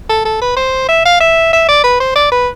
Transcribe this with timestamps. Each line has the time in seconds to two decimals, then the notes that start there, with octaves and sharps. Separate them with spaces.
0.09 A4
0.25 A4
0.41 B4
0.56 C5
0.89 E5
1.05 F5
1.20 E5
1.53 E5
1.68 D5
1.84 B4
2.00 C5
2.16 D5
2.31 B4